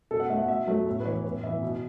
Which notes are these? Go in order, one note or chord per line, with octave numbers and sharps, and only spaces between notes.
B2 A4
F#5
A3 E5
F#5
B2 E5
F#3 A3
A2
B4
E3 B3 C#5
A2 B4
E3 B3 E5
B2